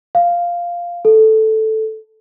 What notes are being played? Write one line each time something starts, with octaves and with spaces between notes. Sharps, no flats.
F5
A4